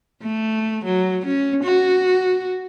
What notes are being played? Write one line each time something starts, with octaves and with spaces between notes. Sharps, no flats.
A3
F#3
C#4
F#4